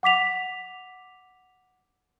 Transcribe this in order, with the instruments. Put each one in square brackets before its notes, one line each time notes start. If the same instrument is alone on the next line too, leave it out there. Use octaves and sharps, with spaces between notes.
[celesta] F#5 D6 B6 F7